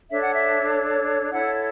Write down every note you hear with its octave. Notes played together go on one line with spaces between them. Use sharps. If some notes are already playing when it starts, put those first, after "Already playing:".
D4 A4 C#5 E5
F#5
E5
E4 A4 C#5 F#5